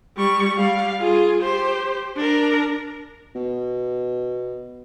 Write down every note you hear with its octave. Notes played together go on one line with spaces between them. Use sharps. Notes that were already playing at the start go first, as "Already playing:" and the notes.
G3 C#6
G3 F5
F4 G#4
G4 C5
D4 A#4
B2